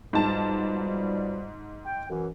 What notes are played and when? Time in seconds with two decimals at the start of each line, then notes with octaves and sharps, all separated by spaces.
0.13 G#2 B2 F3 G3 A5
1.85 G5
2.10 F#2 E3